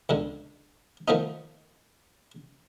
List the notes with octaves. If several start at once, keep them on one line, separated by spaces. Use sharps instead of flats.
C#2 B2 D3
D#3 F3 A3 B3 D#4